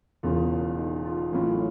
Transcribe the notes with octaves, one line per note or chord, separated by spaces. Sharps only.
E1 E2 C#3 F4
D#4
F4
A1 A2 F#3 F4